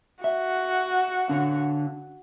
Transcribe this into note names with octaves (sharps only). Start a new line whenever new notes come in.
F#4 E5
D3 D4 F5